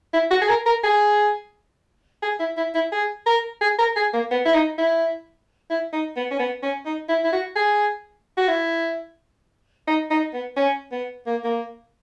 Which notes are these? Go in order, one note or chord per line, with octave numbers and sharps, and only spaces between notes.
E4
F#4
G#4
A#4
A#4
G#4
G#4
E4
E4
E4
G#4
A#4
G#4
A#4
G#4
A#3
B3
E4
D#4
E4
E4
D#4
B3
C#4
B3
C#4
D#4
E4
E4
F#4
G#4
F#4
E4
D#4
D#4
B3
C#4
B3
A#3
A#3